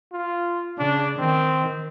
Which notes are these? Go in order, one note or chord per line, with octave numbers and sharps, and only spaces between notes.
F4
C#3 D4
D#3 C4